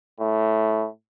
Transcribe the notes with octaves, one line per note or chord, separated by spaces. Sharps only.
A2